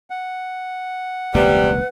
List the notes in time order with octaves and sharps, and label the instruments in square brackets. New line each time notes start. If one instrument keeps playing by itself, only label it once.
[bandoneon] F#5
[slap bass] E1 C#2 A#3 [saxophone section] C3 G3 [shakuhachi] B4